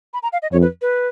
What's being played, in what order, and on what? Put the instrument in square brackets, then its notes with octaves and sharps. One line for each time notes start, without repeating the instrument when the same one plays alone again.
[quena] B5
A#5
F5
D#5
[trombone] F2 [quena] C#5
[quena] B4
B4